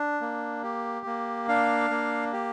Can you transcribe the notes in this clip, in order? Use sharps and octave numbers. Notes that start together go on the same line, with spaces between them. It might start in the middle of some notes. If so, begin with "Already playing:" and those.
Already playing: D4
A#3
G4
A#3
D4 F5
A#3
G4